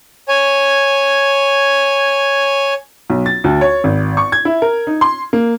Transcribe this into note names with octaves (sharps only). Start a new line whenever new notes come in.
C#5 G#5
B1
A6
D2
C#5
G#1
C#6
G#6
E4
A#4
D#4
C6
A#3